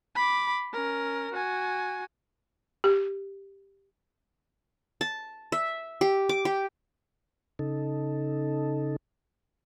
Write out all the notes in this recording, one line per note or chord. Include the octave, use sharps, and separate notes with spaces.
B5 D6
C#4 A#4
F#4 G#5
G4
A5
E5
G4
D6
G4
C#3 D#4 A4